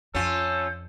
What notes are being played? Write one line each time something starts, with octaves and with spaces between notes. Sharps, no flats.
F2 C#4 F4 A4 G6